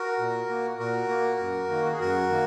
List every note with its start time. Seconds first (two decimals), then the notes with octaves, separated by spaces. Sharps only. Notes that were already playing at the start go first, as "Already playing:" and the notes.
Already playing: F#4 A#4
0.18 A#2
0.49 A#3
0.78 A#2 F#4 A#4
1.09 A#3
1.40 F#2
1.69 D#3 A#3
1.85 F#4
1.92 G#4
2.00 F#2 F#4 A#4
2.29 D#3 A#3